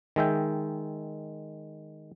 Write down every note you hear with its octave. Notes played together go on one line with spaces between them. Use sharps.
D#3 G#3 E5 G5